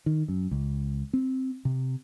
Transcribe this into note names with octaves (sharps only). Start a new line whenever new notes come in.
D#3
F#2
C#2
C4
C3